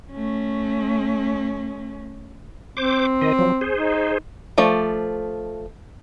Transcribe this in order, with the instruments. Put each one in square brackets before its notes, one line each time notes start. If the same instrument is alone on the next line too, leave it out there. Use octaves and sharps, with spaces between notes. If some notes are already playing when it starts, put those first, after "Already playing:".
[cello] A3 C#4
[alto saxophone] C4 [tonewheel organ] C5 D6
[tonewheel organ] D#3 D#5
F3 F#3
G#4 C5
[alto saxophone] D#4
[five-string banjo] F3 A3 D5